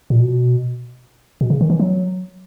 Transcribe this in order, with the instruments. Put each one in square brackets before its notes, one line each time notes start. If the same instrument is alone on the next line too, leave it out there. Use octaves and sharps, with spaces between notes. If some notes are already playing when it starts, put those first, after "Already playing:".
[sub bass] A#2
B2
B2
C#3
D#3
E3
F#3